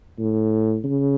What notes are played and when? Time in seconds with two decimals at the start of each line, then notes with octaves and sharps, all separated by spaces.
0.19 A2
0.85 C#3